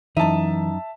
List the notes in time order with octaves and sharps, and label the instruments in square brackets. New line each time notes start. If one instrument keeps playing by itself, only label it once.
[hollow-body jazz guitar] F#2 D#4 [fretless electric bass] E3 [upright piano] E5 A5